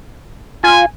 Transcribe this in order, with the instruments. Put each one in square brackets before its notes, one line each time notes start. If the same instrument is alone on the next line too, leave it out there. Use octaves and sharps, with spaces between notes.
[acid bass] F4 [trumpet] G#5